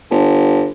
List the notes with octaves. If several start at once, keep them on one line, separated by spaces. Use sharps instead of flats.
G1